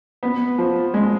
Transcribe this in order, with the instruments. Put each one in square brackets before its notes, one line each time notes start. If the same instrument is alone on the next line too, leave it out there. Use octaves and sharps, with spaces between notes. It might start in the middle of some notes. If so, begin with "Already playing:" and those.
[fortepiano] B3
F3
G#3